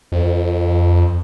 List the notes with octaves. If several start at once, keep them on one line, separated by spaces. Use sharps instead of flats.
F2